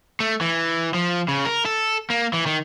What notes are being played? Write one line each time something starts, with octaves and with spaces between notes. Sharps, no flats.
A3
E3
F3
C#3
A#4
A4
A#3
E3
D#3